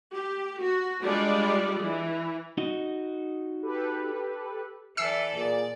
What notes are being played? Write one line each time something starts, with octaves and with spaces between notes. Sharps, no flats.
G4
F#4
G3 G#3 D4 F4 D5
E3
D#4 F#4 D#5
G4 A4 B4
E3 A4 D5 E5 E6 C7
A#2 G#4 D5